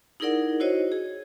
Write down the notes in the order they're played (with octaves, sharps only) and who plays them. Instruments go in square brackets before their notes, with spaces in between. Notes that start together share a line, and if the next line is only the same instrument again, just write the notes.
[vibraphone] D#4 E4 G#4 A#4 D5 F#5
E4 F#4 C5 C#5 D#5
G#4